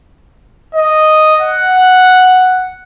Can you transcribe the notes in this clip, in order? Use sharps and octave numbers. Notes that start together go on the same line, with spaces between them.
D#5
F#5